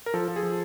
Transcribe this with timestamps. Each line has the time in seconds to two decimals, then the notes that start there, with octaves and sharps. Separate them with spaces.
0.06 A#4
0.14 F3 A4
0.28 F3
0.36 G#4
0.43 F3